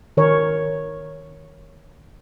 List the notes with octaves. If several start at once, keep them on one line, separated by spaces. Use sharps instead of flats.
D#3 A#4 C#5